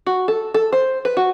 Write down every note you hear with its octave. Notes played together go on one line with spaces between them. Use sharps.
F#4
A4
A4
C5
B4
F#4